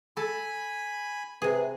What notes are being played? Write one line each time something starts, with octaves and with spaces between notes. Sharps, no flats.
A4 G#5 A5 B5
C3 G#4 B4